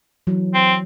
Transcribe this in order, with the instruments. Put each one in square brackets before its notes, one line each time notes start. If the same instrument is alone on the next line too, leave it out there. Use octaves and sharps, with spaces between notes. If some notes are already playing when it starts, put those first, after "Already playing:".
[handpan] E3 F#3
[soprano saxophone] C4